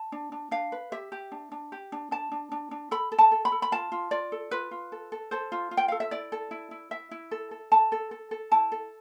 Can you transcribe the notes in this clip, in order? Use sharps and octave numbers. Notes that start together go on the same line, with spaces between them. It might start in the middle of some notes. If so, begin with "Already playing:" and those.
Already playing: A5
D4
D4
D4 F5
B4
G4 E5
G4
D4
D4
G4
D4
D4 A5
D4
D4
D4
A4 B5
A4
A5
A4
B5
A4
B5
F4 A5
F4
F4 D5
A4
F4 B4
F4
A4
A4
A4 C5
F4
F4
G5
A4 F5
E5
E4 D5
A4
E4
E4
E4 E5
E4
A4
A4
A4 A5
A4
A4
A4
E4 A5
A4